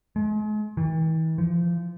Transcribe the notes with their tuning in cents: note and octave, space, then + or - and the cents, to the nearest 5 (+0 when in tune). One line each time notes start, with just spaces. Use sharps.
G#3 +40
E3 -45
F3 -25